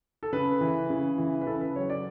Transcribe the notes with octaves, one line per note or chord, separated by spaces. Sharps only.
A4
C#3 B4
E3
C#3
E3
B4
C#3 A4
B4
F#3 C#5
D5